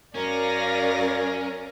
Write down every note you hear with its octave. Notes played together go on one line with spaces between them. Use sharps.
F#2 C#4 A#4 D5 F5 A#6